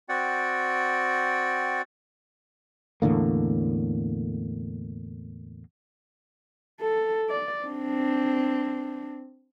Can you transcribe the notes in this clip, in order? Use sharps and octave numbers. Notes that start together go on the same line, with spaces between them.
C4 F#4 D5 F#5 G5
E2 A2 D3 A#3
A4
D5
C4 D4